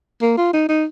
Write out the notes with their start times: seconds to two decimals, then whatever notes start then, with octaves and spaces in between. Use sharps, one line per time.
0.22 A#3
0.38 F4
0.54 D#4
0.69 D#4